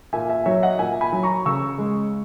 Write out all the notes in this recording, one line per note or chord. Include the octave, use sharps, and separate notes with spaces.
A#2 E5 G#5
E5 G#5
F#3 C#5 E5
D#5 F#5
A#2 E5 G#5
G#5 B5
F#3
A#5 C#6
C#3 C#6 E6
G#3